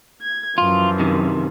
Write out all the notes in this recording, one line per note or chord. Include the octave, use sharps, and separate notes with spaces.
G#6
F#2 E3 F3 F4
C3 D#3